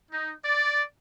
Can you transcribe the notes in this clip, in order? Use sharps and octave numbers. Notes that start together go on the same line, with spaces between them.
D#4
D5